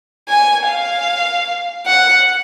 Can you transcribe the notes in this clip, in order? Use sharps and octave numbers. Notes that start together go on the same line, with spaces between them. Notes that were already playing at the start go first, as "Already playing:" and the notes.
G#5
F5
F#5